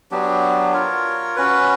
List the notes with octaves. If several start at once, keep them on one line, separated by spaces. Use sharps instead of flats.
F#3 B3 D4 G4
F4 A#4 C#5
C#4 F#4 B4